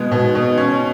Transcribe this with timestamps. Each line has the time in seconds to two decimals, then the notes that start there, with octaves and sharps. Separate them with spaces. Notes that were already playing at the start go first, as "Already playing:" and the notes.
Already playing: B2 G#3 B3
0.12 B2
0.35 B2
0.57 C#4